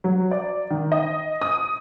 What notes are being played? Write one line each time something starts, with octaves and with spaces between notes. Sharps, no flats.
F#3
D5
D#3
D#5
D#6